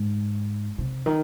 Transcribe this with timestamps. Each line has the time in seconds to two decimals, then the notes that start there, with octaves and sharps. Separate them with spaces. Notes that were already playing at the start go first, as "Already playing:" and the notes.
Already playing: G#2
0.78 C3
1.06 D#3